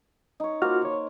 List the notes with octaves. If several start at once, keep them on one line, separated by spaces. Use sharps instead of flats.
D#4 C#5
A#3 F4 F#4 C5 F6
C#5